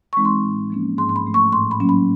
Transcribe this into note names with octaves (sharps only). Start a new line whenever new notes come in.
E3 G#3 C4 D#4 C#6
C6
A2
F3 A#3 C#4
G#2 C6
C6
B5
F3 A3
C#6
A2 C6
B5
F#3 A#3 C#4
B5